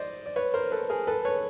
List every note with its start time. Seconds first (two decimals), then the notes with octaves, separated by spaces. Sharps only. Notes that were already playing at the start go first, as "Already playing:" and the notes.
Already playing: C5 D5 D#5
0.26 D5
0.36 B4 C#5
0.54 A#4 C5
0.72 A4 B4
0.89 G#4 A#4
1.07 A4 B4
1.25 B4 C#5